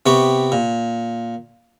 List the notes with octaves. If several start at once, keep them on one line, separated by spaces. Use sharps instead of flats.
C3 B3 G4 C#6
A#2